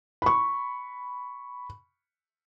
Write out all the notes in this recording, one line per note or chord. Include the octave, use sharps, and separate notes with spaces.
B5 C#6